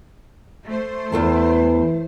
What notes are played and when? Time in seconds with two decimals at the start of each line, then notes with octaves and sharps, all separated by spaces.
0.66 A3 C5
1.12 E2 E3 A4 A5